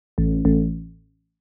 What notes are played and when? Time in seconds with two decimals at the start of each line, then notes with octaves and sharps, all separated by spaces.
0.18 A1
0.45 A1